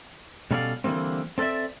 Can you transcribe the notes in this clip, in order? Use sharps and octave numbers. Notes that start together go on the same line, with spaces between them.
B2 G3 C#4 A4 D5 F5
D3 E3 G3 A#3 C4
C4 A4 B4 D5 E5